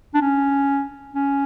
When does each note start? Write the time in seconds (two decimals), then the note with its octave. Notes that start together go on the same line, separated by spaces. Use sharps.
0.14 D4
0.21 C#4
1.14 C#4